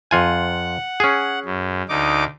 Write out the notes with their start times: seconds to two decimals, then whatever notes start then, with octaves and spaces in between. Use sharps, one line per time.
0.11 F2 F4 F#5 G#5
1.00 C#4 G#4
1.45 F#2
1.89 D2 D#4 D6